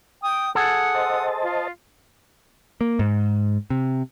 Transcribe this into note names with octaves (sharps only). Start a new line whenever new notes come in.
G5 D#6
G#4 A4 F#5 D#6
C5 D#5 A5
F4
A#3
G#2
C3